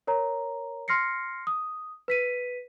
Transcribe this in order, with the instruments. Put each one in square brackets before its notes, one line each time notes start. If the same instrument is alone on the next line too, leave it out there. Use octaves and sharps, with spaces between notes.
[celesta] A#4 C#5 A#5
C6 F6 A#6 C7 C#7
D#6
B4 B6 D#7